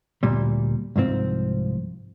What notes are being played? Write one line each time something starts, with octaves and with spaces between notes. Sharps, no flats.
D2 A#2 G3
C2 G#2 F3 C4